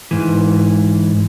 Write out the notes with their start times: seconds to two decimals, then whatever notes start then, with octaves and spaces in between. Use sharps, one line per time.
0.11 G#2 E3